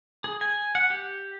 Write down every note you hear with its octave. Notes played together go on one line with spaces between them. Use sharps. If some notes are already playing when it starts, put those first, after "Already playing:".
G#4
G#5
F#5
G4